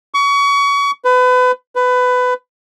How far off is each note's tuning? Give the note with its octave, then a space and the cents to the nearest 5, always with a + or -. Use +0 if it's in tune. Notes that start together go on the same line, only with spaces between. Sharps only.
C#6 +30
B4 +30
B4 +20